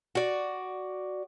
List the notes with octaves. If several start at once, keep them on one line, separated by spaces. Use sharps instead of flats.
F#4 D5